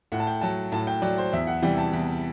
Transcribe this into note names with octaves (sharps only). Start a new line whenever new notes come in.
A2 F#5
A5
G5
F#3 A5
A2 A5
G5
F#3 D5
C5
E2 E5
F#5
C3 E3 G3 G5
A5
E2